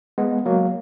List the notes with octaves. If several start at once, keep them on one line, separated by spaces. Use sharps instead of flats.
G#3 B3
F#3 A#3